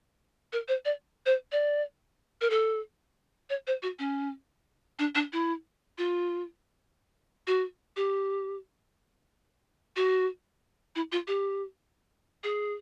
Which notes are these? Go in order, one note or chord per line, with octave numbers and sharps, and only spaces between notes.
A#4
C5
D5
C5
D5
A#4
A4
C#5
C5
F#4
C#4
D4
D4
E4
F4
F#4
G4
F#4
E4
F4
G4
G#4